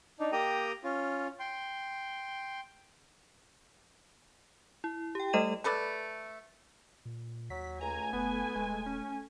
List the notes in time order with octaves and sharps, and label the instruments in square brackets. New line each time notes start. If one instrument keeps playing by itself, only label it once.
[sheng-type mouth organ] D4 D#4
A#3 G4 G5 A#5 D#6
C#4 F4
G5 C6
[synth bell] E4
G4 G5
G3 A3 A4 D#5 D#7 E7
[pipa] A3 A4 B4 D5
[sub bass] A#2
[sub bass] D#2 [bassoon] F#3 [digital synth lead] B6
[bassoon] C#2 [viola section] A3 G#5 [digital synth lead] A#5
[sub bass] F#1 [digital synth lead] B3 [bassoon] B4
[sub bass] D#1 [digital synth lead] G#3
[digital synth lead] C#4